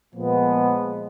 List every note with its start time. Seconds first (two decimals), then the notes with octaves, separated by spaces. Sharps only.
0.14 A#2 F3 G#3 B3